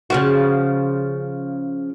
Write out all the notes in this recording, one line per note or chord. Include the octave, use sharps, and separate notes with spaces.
C#3 F3 F#4